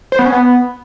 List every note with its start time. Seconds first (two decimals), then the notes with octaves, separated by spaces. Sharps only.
0.12 C5
0.19 B3
0.26 C#4
0.32 B3